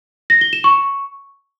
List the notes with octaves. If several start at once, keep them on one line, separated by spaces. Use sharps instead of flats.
A#6
G7
E7
C#6